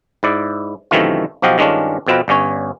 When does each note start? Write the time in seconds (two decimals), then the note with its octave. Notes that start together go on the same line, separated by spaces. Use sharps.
0.23 G#2 E4 D5
0.91 F#2 C3 D#3 E3 A3 F4
1.42 B1 F3 F#4 G4 D#5 F5
1.58 G2 D#3 G#3 C#4 D4 F4
2.07 F2 B2 C4 F4 B4
2.28 G1 G2 C#4 C#5